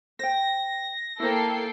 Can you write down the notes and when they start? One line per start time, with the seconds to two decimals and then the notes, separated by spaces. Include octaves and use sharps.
0.19 C5 G5 A#6
1.20 A#3 E4 A4 C5 G5 C7